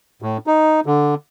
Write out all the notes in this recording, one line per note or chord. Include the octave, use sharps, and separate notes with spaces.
A2
D#4
D3